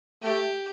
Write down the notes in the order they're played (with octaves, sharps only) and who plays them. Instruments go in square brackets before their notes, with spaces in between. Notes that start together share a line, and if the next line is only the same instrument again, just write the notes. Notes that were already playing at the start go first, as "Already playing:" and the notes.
[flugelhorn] A3 [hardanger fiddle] G4